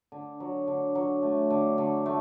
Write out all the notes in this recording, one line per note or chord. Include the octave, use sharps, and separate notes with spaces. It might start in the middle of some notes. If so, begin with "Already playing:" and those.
D3
F#3
D3
F#3
A3
D3
D3
A3